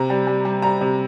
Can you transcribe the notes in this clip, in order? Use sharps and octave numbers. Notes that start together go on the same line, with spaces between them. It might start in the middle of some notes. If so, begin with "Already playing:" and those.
Already playing: C3 A#5
G3
G3
G3
G3 A#5
C3